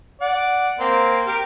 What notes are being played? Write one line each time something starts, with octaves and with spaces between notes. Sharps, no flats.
D5 F#5
A#3 C4
G4 A#4